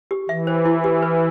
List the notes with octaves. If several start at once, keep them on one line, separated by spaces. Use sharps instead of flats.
G4
E3 E5
C5
E4
G4
B4